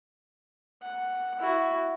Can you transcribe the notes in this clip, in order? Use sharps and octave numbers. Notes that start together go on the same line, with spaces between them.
F#5
E4 F#4